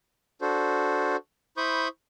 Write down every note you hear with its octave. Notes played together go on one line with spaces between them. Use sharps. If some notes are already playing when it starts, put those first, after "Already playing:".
D4 F#4 A4 C5
E4 C5 B5 C#6 D#6 G6